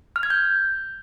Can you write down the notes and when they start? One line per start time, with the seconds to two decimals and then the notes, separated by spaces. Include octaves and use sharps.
0.16 F6
0.23 G#6
0.30 G6